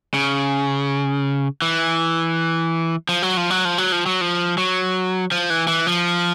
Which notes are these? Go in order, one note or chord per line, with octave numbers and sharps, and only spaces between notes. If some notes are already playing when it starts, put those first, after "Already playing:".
C#3
E3
F3
F#3
F3
F#3
F3
F#3
F3
F#3
F3
F#3
F3
E3
E3
F3